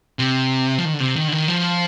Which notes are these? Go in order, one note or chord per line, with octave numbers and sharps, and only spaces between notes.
C3
F3
D#3
D3
C3
D#3
D3
D#3
F3